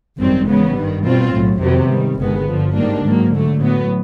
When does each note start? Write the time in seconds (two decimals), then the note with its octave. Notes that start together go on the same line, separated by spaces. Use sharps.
0.19 G#1 F#2 D#3 G3 C4
0.46 C#3 E3 G#3 B3
0.75 G2 D#3 G3
1.04 B2 G3 C4 F4
1.33 B1 A2 F#3
1.61 F2 C3 D#3 F#3 B3
1.89 G#2 D#3 G3
2.18 G1 G2 D#3 G#3 B3
2.46 G2 D3 F3
2.75 G#2 D#3 G3 A#3 D4
3.03 G#2 D#3 F#3 A#3
3.33 D3 F#3 A3
3.60 A2 F#3 B3